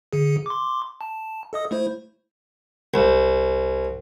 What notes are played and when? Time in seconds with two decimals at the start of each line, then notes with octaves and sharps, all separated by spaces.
0.13 D3 G#4
0.46 C6 D6
1.01 A5
1.53 A4 D#5 D#6
1.71 A3 E4 C5
2.94 C2